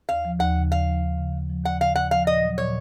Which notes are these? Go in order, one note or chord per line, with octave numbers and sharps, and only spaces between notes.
D#2 F5
F3
D#2 F#5
C#3
D#2 F5
F3
D#2
C#3
D#2
F3
D#2 F#5
C#3 F5
D#2 F#5
F3 F5
A#2 D#5
F#3
A#2 C#5